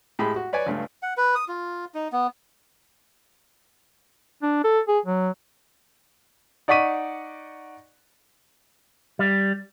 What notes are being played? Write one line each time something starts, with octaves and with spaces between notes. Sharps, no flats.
A2 G#3 G4 G#4 B5
F#4
B4 C#5 D5 G#5
C#2 G2 A3
F#5
B4
D#6
F4
D#4
B3
D4
A4
G#4
F#3
D#4 D5 F#5 C#6 B6 D#7
G3